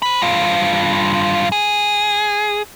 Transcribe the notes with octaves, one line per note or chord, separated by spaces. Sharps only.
C5 B5
G2 F4
G#4